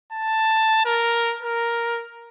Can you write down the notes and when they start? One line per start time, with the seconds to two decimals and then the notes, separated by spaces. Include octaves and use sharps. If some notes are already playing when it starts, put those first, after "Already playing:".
0.12 A5
0.85 A#4
1.42 A#4